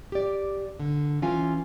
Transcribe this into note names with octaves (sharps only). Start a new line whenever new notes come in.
G4 D5
D3
E3 C#4 F4 F5 G#5